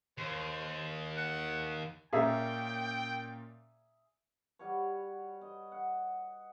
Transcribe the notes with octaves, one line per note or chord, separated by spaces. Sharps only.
D#2 C5
F#5
A#2 C#4 G#4 E5 G5 A#5
G3 F#4 B4 C#5
D#5
F#5